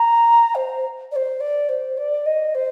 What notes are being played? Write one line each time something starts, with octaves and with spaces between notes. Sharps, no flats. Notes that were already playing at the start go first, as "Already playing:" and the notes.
Already playing: A#5
C5
D5
C5
D5
C5
D5
D#5
C5